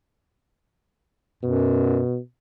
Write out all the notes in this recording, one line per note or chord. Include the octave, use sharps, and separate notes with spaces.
F#2 B2